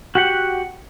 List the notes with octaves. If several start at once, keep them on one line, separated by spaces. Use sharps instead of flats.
F#4 G4 F#5